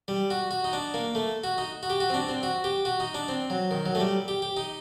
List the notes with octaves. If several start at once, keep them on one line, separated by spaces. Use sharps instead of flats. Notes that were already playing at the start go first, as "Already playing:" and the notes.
G3
F#4
F#4
D#4
D4
A#3
A3
F#4
D#4
F#4
G4
F#4
C4
D4
C4
F#4
G4
F#4
D#4
D4
C4
F#3
D#3
F#3
A3
G3
G4
G4
D#4